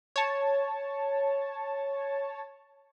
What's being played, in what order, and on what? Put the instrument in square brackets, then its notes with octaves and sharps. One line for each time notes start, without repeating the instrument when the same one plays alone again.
[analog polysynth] C#5 A5